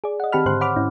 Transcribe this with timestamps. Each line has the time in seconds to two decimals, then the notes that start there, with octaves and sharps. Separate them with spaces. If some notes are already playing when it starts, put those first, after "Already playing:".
0.04 G#4 D5
0.20 D#5 F#5
0.32 D#3 C4 G4 A5 B5 F6
0.46 G#2 D3 G4 C5 C6 F#6
0.61 C#5 F#5 B5 D6 F6
0.76 G#2 C#4 E4